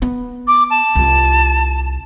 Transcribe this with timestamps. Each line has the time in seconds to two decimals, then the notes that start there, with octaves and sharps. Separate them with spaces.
0.02 B3
0.48 D6
0.70 A5
0.95 C2 F4